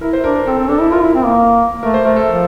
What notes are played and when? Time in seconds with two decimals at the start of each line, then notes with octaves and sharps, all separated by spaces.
0.01 E4 A#4
0.13 C5
0.24 D4 A#4
0.36 A#4
0.46 C4 A4
0.58 C4
0.69 D4 A4
0.80 E4
0.91 F4 A#4
1.03 E4
1.15 C4
1.26 A#3
1.83 A3 A#4
1.94 C5
2.04 A3 A#4
2.16 A4
2.28 F3